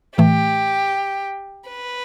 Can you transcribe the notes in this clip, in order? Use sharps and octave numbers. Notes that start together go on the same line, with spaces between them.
A2 E3 A3 G4
B4